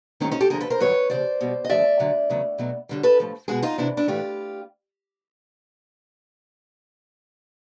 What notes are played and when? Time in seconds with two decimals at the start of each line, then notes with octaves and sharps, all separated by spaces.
0.20 G#2 D#3 F#3 A3 C#4 D#4
0.31 C#4 D#4
0.41 G4 A4
0.50 D2 D3 F3 G#4 A#4
0.60 A4 B4
0.70 A#4 C5
0.80 G2 D#3 F#3 B4 C#5
1.10 D#2 C#3 F3 C5 D5
1.41 B2 G3
1.65 D#5
1.69 D#2 D3 F3 A3 D5 E5
1.99 D2 D3 F#3
2.30 E2 C#3 F#3 A3
2.58 B2 F#3 A3
2.89 F#2 D3 G3
3.03 A4 B4
3.19 A2 F3 A3
3.48 B2 G#3 F#4 G#4
3.63 D#4 F4
3.77 E2 C3 E3 D4 E4
3.97 D4 E4
4.08 A2 E3 A3 F4 G4